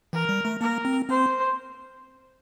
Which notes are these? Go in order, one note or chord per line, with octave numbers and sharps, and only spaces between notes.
E3 A#4
G3
A3
A#3 A#4
C4
C4 C5